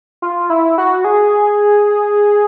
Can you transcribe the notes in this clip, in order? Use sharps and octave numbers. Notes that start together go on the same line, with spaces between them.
F4
E4
F#4
G#4